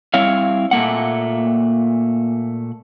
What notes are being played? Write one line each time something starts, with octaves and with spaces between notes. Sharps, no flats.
G3 C4 E4 C#5 F5
A#2 A3 A#3 F#5